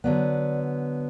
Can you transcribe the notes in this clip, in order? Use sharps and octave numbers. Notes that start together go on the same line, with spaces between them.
D3 F#3 B3 D5